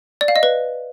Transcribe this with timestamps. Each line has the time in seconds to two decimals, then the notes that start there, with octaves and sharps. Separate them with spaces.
0.21 D5
0.28 F5
0.36 D#5
0.43 B4